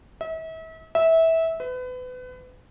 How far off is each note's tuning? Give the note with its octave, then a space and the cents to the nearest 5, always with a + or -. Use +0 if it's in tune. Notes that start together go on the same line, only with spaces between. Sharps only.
E5 -40
E5 -20
B4 +30